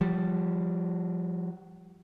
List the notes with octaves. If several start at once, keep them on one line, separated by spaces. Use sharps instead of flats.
F3 G3